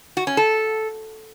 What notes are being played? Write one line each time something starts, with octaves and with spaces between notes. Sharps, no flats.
F#4
C#4
A4